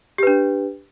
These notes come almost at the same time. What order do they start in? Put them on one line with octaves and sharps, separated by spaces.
G4 B4 D4